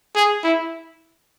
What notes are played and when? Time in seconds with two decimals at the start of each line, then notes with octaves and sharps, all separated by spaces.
0.16 G#4
0.44 E4